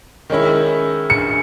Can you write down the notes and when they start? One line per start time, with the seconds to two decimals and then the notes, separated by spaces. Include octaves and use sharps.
0.30 D#3 G#3 C#4 E4
1.10 C#7